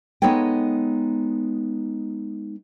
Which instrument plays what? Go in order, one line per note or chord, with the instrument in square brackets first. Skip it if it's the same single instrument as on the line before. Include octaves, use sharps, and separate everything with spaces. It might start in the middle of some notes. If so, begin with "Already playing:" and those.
[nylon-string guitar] G#3 B3 D#4 A4 C#5 G5